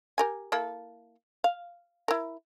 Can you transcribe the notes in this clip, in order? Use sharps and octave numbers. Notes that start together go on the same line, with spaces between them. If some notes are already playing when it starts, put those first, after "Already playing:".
G4 A#4 G#5
A#3 E4 A4
F5
E4 A#4